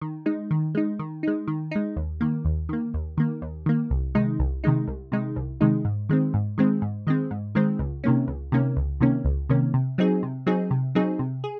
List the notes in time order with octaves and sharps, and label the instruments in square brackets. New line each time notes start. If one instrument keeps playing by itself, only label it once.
[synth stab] D#3
G#3 D#4
D#3
G#3 D#4
D#3
G#3 D#4
D#3
G#3 D#4
D#2
D#3 A#3
D#2
D#3 A#3
D#2
D#3 A#3
D#2
D#3 A#3
C2
C3 D#3 G#3 D#4
C2
C3 D#3 G#3 D#4
C2
C3 D#3 G#3 D#4
C2
C3 D#3 G#3 D#4
G#2
D#3 G#3 C4
G#2
D#3 G#3 C4
G#2
D#3 G#3 C4
G#2
D#3 G#3 C4
C#2
C3 D#3 A#3 C#4
C#2
C3 D#3 A#3 C#4
C#2
C3 D#3 A#3 C#4
C#2
C3 D#3 A#3 C#4
C3
F#3 C4 D#4 G#4
C3
F#3 C4 D#4 G#4
C3
F#3 C4 D#4 G#4
C3
G#4